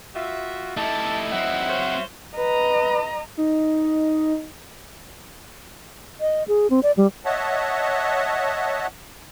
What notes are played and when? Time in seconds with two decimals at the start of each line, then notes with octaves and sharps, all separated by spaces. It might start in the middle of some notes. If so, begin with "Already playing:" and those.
0.16 F4 F#4 E5
0.77 A3 D#4 E4 G4 A5
1.32 F#3 C4 E5 F#5
1.69 C5 C#5 F5
2.37 B4 D#5 A#5
3.37 D#4
6.21 D#5
6.48 G#4
6.70 C4
6.83 D5
6.97 G3
7.25 C#5 D#5 E5 F#5 A5